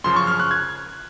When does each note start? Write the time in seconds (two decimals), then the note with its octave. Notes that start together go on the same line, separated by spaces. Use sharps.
0.04 F#2 C#3 F3 C6
0.16 C#6
0.27 F6
0.40 F#6
0.51 G#6